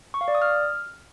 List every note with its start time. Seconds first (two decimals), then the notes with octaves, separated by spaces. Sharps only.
0.14 C#6
0.21 F5
0.28 D5
0.35 D#6
0.42 F6